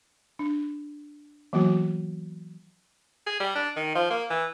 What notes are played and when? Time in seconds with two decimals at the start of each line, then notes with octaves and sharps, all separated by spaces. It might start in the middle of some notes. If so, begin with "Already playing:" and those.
0.39 D4
1.53 E3 F#3 A#3 B3 F#4
3.27 G#4
3.40 G3
3.55 D4
3.76 D#3
3.95 F3
4.10 A#3
4.30 E3